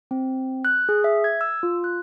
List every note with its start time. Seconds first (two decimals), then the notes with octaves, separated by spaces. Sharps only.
0.11 C4
0.65 F#6
0.89 G#4
1.04 E5
1.24 G#6
1.41 E6
1.63 F4
1.84 F#6